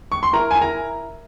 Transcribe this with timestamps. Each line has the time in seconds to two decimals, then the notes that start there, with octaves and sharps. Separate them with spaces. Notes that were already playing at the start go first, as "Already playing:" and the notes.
0.12 C#6
0.23 C6
0.33 E4 A#4 A#5
0.51 E4 G#5
0.61 A#4 A#5